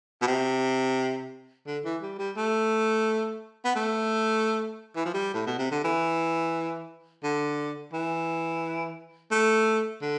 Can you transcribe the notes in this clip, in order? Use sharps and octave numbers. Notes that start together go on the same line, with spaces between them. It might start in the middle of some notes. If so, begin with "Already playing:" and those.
B2
C3
D3
E3
G3
G3
A3
B3
A3
E3
F3
G3
A2
B2
C3
D3
E3
D3
E3
A3
D3